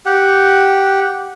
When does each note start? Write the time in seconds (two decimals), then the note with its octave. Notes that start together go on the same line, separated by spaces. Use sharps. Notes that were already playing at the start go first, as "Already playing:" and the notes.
0.06 G4 F#5